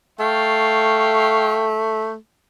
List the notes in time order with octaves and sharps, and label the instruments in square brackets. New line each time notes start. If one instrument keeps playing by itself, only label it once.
[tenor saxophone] A3 [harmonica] F5 G5 C#6